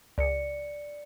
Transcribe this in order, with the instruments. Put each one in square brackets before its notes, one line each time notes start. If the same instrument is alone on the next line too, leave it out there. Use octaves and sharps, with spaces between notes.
[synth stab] C#2 [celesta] D5 C#7